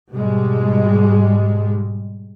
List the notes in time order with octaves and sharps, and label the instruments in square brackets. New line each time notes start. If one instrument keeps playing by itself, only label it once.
[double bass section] G#2 B2 G3 G#3